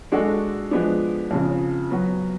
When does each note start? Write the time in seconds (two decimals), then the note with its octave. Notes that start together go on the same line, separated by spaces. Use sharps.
0.12 G#3 D4 F#4 A4
0.71 F3 G#3 B3 D4
1.31 F2 C#3 F3
1.91 F#3 B3 F#4